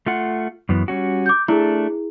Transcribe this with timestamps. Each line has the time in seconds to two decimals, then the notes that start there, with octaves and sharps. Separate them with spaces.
0.06 A3 F4 F#5
0.69 F#2 E3 B3
0.88 G3 C#4 F#4
1.26 D6 G6
1.48 A3 D4 E4 G#4